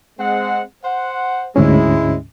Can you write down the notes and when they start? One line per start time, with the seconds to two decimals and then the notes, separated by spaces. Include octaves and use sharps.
0.19 G#3 C4 F#5
0.84 C5 F#5
1.56 D2 G#2 G#3 C#4 E4